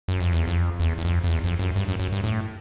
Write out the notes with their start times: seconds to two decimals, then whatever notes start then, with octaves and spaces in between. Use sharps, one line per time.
0.08 F#2
0.20 F2
0.33 E2
0.47 F2
0.80 E2
0.98 E2
1.04 F2
1.24 F2
1.28 E2
1.44 F2
1.59 F#2
1.76 G2
1.88 F#2
2.00 F#2
2.13 G2
2.24 A2